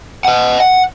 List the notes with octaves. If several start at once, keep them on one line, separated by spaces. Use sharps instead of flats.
D#5 F#5
F#5